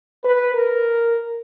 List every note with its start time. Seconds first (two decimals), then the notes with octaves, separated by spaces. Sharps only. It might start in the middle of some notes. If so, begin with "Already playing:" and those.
0.23 B4
0.55 A#4